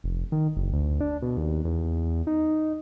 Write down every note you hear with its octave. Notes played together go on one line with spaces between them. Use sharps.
F1
D#3
F#1
D2
D4
B2
D#2
E2
D#4